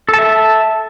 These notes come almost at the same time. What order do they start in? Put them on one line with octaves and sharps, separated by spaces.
A4 A5 E5